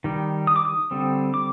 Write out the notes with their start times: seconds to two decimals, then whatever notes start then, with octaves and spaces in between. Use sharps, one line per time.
0.04 D#3 G3
0.47 D#6
0.56 D6
0.65 D#6
0.91 D3 G3 C4
1.34 D6